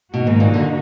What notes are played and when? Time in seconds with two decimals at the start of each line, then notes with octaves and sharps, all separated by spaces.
0.13 B2 D#3 A#3 D#4 F#4
0.27 G#2
0.40 A#2
0.54 D3